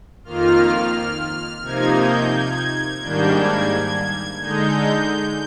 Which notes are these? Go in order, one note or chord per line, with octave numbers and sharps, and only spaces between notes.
F2 D#3 A#3 F4 F6
C3 F3 A#3 D#4 G#6
G6
G#6
G#2 D#3 G3 A#3 D4 G6
G#6
D3 G#3 D#4 G6